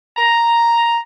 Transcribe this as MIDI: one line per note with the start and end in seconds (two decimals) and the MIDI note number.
0.17 0.96 82